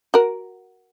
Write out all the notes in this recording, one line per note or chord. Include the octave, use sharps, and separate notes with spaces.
F#4 A#4